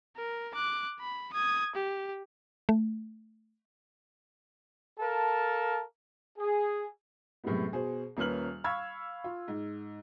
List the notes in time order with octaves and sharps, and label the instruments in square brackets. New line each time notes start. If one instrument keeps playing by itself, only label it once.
[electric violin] A#4
D6 F#6
B5
D#6 G#6
G4
[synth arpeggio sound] A3
[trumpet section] A4 A#4 F5 A5
G#4
[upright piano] F#2 A2 C3 G3 G#3 B3
B2 G#4 C5
D#1 A#3 C#4 B4 F6 F#7
F5 B5 C#6 E6 G#6
F4
G#2